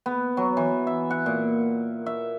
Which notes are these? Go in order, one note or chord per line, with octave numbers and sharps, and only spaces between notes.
B3
F#3
E3
E5
F#5
A#2
E5